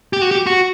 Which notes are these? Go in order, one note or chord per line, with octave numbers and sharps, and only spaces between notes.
G4
F#4
G4
F#4